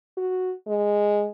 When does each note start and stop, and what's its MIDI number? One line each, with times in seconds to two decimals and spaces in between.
0.17 0.53 66
0.67 1.28 56